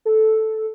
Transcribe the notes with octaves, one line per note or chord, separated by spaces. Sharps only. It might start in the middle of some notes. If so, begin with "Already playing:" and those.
A4